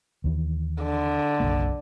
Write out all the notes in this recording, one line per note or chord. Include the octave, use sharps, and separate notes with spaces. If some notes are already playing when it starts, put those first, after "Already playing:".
D#2 E3
D3
F#1 B1 A#3